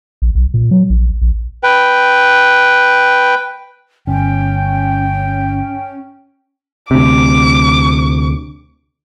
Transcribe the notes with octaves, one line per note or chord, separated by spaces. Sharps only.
A#1
B1
A#2
F#3
A#1
A#1
B4 G5
G1 C#4 G5
D2 C3 D6